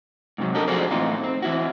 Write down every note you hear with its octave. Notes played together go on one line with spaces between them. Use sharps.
G#2 C3 F#3
D4 F#4 G4 A4 A#4 D#5
F3 F#4 G#4 A4 C5 D5
A2 E3 C4 D#4 F4
C4
E3 E4 F#4